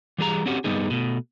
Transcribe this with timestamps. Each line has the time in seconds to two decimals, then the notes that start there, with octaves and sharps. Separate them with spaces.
0.18 E3 G3 G#4 A#5
0.46 C4 C#4 F#4 G4
0.64 G2 C#3 G3 B3 D#4 G#4
0.90 B2 A3